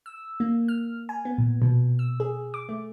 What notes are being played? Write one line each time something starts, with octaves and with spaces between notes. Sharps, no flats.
E6
A#3
F6
G#5
B3
A#2
B2
E6
G#4
D6
A3